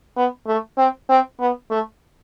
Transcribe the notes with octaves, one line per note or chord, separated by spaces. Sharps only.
B3
A3
C4
C4
B3
A3